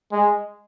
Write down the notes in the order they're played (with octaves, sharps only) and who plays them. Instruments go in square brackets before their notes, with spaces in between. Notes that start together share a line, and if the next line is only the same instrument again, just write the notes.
[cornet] G#3